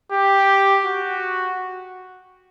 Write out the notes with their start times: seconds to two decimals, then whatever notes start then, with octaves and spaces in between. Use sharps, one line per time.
0.12 G4
0.85 F#4